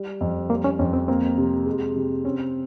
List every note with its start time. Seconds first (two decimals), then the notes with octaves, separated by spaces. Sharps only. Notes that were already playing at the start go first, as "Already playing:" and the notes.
Already playing: G3
0.21 F2
0.50 G3 A#3
0.64 C#4
0.79 F2 C#4
0.93 C4
1.08 A#3 C4
1.38 C3
1.66 G#3
1.96 C3
2.24 C4 C#4